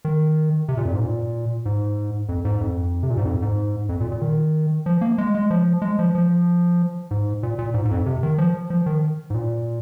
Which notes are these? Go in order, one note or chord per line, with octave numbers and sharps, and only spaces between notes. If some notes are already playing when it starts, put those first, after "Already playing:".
D#3
C3
A#2
F2
G#2
A#2
G#2
F2
G#2
F2
C3
A#2
G#2
F2
G#2
F2
A#2
A#2
D#3
F3
A#3
G#3
G#3
F3
G#3
F3
F3
G#2
A#2
A#2
G#2
G#2
F2
C3
D#3
F3
F3
D#3
G#2
A#2